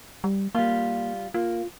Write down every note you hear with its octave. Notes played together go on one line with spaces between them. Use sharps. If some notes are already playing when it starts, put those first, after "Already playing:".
G3
G3 A#3 F4
A#3 F4